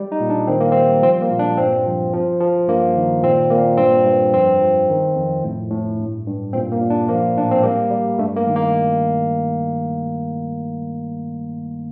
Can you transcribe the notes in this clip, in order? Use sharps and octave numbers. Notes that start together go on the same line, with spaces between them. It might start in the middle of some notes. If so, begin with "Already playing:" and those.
Already playing: G3
D#4
A#2
D4
D#3 C4
A#3
G3 C4
F3 C4
A#3
A#2
D4
G2 C4
F3
F3
F3
G2 A#3
D#3
A#2 C4
A#2 A#3
G2 C4
G2
F2 C4
F3
D#3
F2
A2
A2
G2
G2
A#2 C4
A#3
A#2
D4
F3 A#3
A2 D4
C4
G3 A#3
G3
G2 A3
A#3
D#3
A#3